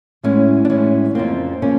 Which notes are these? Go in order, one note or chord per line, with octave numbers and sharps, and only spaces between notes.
A2 E3 G#3 B3 C#4
D4
A2 E3 G#3 B3 C#4
F2 C#3 F3 A#3 C4
C#3 F3 A#3 C#4